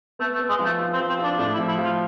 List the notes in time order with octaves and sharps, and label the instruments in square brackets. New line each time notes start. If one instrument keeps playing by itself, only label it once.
[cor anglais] A3 [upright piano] B3
[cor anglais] A3
[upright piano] B3
[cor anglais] G#3
[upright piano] F3
[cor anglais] A3
[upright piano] F4
[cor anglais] C4
[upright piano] F3
[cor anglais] C4
[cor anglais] D4 [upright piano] F4
[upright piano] A2 [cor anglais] D4
[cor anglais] E4
[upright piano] F3
[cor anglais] E4
[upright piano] F3
[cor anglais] F4